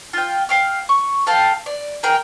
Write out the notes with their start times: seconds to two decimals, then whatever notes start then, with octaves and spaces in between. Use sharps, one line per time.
0.13 F4 G5
0.49 F5 G5 F6
0.89 C#6
1.27 A4 F5 G5 A5
1.66 D5
2.03 G#4 A#4 G5